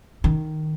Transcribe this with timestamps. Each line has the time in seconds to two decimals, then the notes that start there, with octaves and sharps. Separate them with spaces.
0.24 D#3